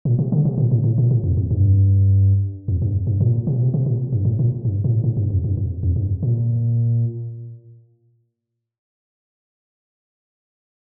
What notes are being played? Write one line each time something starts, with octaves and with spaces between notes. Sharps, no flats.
A#2
C3
D3
C3
A#2
A2
A2
A#2
A2
F2
F2
G2
F2
G2
G2
A#2
C3
A#2
C3
C3
A#2
G2
A2
A#2
G2
A#2
A2
A2
G2
F2
G2
F2
F2
G2
A#2